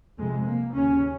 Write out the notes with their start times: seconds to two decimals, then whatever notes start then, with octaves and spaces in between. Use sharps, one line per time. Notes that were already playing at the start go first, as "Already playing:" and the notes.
0.17 F2 C3 G#3
0.45 A#3
0.74 D#2 C#3 C#4